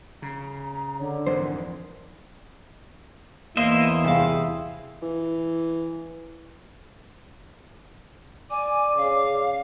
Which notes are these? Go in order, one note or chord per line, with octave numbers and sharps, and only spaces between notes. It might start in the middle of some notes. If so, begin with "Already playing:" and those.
C#3 A#5
D3 C#5
F2 G#2 E3 A#4 C5
E2 A#3 E4 C5 D#5 E5
C3 G#4 F5
E3
D5 G#5 D6
C#3 F5